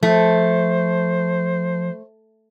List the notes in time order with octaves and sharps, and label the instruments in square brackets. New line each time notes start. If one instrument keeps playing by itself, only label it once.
[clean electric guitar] F3 [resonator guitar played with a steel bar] A3 [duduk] C5